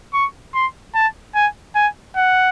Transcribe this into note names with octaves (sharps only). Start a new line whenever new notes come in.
C#6
C6
A5
G#5
G#5
F#5